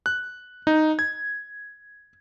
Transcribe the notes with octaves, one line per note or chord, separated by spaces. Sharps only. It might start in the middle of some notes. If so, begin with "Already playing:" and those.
F#6
D#4
G#6